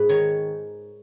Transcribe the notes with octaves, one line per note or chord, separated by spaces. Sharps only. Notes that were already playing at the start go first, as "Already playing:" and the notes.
Already playing: G#2 G#4 B4
D#3 C#5